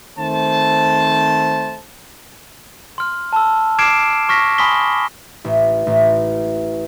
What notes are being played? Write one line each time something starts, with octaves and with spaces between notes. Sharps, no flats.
D#3 A3 C4 C5 A5
C6 F6
A5 E6
D6 F6 G#6 C7 D7 E7
C#6 F6 A#6 B6
G#5 B5 C6 D#6 B6 G7
A1
A1